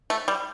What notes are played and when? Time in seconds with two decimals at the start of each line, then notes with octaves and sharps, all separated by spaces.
0.10 A3
0.28 G3